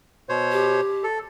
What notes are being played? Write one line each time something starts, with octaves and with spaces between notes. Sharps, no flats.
B2 C5 C#5
G4
A4